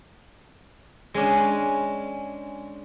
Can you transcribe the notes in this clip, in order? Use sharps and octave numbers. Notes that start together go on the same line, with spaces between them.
G#3 C#4 D4